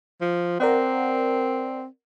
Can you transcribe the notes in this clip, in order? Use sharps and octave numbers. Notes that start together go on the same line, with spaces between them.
F3
C4 A#4 D5 F#5